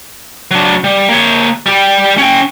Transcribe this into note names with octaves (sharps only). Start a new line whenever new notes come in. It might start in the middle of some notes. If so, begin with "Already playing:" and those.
F#3 D4
G3
A#3 C#5
G3 G4
C#4 G5